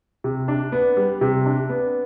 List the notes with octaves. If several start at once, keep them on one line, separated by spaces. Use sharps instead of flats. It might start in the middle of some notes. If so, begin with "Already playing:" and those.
C3
D4
B3
G3
C3
D4
B3